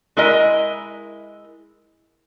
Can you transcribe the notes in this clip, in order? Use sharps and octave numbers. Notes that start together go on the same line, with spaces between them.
G#3 E4 A#4 D#5